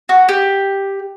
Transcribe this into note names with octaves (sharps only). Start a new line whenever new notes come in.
F#4
G4